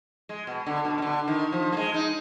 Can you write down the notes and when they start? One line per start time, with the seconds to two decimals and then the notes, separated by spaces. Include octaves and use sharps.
0.29 G#3
0.47 B2
0.66 D3
0.85 B2
0.98 B2
1.02 D3
1.28 D#3
1.52 F3
1.72 A#3
1.77 G#3
1.94 D#4